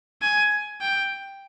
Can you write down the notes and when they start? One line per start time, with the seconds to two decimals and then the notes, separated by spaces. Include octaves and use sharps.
0.22 G#5
0.81 G5